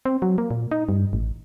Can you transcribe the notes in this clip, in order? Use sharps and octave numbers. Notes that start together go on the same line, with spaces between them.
C4
F#3
A#3
A#2
D#4
G2
A1